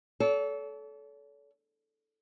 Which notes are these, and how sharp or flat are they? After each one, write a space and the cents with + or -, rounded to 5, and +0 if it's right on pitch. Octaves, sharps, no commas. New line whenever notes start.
A4 -20 C#5 +45